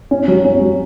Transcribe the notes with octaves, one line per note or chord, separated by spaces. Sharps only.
C#4
F#3
C#4
F#3